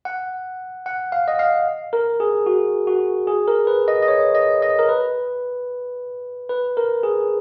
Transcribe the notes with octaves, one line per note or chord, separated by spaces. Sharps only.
F#5
F#5
F5
D#5
F5
A#4
G#4
F#4
F#4
G#4
A#4
B4
D#5
D#5
C#5
D#5
D#5
A#4
B4
B4
A#4
G#4